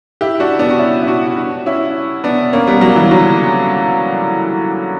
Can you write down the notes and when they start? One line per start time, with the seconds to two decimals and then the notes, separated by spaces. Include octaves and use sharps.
0.21 E4 G4
0.40 D4 F#4
0.59 B3 D4
0.71 F#4
0.79 C#4 E4
1.02 E4
1.07 D4 F#4
1.36 D4 F#4
1.66 C#4 E4
2.24 B3 D4
2.53 A#3 C#4
2.67 G3 B3
2.81 F#3 A#3
2.96 E3 G3
3.11 D3 F#3